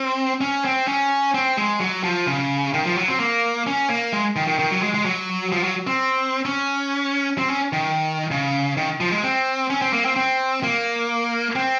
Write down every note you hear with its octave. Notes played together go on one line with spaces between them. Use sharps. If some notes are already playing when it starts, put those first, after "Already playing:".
Already playing: C4
C#4
C4
C#4
C4
G#3
F#3
F3
C#3
D#3
F3
F#3
C4
A#3
C#4
A#3
G#3
D#3
D#3
D#3
F#3
G#3
G#3
F#3
F3
F#3
C4
C#4
C4
C#4
D#3
C#3
D#3
F3
G#3
C4
C#4
C4
A#3
C4
C4
A#3
C4